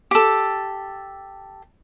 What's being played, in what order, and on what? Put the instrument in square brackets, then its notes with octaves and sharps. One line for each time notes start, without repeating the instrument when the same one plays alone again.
[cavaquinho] G4 A4